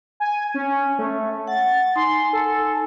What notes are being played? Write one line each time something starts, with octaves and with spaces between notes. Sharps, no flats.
G#5
C#4
A3
F#5 A6
D#4 G#5 C6
A4